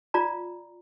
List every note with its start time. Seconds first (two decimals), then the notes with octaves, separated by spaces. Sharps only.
0.14 F4 D5 A#5